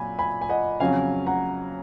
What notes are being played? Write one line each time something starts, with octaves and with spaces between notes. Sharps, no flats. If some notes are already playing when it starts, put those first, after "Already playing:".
Already playing: A#2 F#3 G#5 B5
G#5 B5
G#5
D#5 F#5
F2 C#3 F#3 C#4 F5 G#5
F#5 A#5